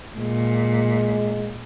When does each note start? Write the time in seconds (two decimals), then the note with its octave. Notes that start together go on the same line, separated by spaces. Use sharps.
0.16 A#2 G#3